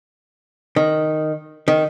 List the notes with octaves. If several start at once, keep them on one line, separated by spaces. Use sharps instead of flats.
D#3
D#3